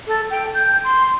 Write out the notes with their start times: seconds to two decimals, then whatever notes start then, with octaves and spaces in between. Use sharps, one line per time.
0.07 A4
0.30 G5
0.55 G6
0.84 C6